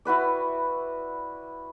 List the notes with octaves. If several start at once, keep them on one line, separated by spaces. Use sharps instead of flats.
E4 F#4 B4 D5